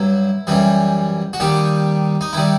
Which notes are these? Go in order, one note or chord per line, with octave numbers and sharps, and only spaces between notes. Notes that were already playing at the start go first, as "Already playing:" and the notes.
Already playing: G2 F#3 E4
F#2 E3 G3
F#4
D#2 D#3 G3 G4
D#4
D#3 G3 E4